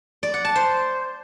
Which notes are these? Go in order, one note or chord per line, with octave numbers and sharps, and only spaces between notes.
D5
F#5
A5
C5